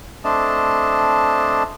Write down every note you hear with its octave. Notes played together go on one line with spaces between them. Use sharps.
A3 C4 D4 D#5 A5